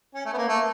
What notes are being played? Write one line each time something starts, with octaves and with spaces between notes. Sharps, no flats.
C#4
A3
B3
A#3
A3